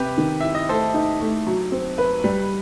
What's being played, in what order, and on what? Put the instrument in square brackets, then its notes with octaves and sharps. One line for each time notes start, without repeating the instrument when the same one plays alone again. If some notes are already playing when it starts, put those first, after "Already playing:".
Already playing: [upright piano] C3 [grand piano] G4 B4
[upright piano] D#3
[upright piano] E4 [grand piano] E5
[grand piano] D#5
[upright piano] A3 [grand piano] A4 C5
[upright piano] D#4
A3
F#3
C4
B4
G3